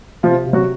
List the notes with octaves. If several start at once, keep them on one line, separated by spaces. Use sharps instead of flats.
C3 F3 F4
C3
F#3 F#4